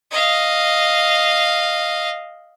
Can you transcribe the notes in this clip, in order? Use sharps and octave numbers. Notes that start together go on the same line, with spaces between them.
D#5 F5